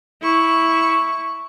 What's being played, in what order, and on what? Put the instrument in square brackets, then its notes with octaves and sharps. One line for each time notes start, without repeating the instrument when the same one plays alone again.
[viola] E4 C#6